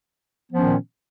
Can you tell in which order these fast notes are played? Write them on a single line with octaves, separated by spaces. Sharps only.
B3 F3 C#4 D#3 A#2